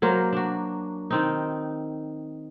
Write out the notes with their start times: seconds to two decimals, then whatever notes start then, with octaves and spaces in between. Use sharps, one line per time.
0.02 F#3 A#3 A#4 C5
0.33 D4 F#4
1.10 D#3 C4 D#4